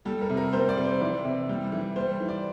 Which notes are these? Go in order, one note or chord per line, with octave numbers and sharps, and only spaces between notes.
G3 A4
A#4
C3
A#4
G3 C5
D5
C3
C5
E3 D5
C3
G3
E3
G3 C5
E3
D5